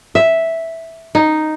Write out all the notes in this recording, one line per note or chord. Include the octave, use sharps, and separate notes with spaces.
E5
D#4